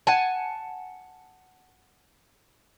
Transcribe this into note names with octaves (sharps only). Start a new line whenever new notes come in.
F#5 G#5 A5